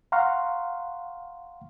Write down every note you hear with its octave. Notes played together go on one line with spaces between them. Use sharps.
F5 F#5 A#5 C6 C#6 F6